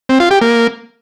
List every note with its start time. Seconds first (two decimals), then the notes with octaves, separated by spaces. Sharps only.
0.09 C4
0.20 F4
0.31 G4
0.41 A#3